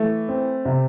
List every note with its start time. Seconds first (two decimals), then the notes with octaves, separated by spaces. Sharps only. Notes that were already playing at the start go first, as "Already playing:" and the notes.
Already playing: E3 A3
0.29 C4
0.65 C3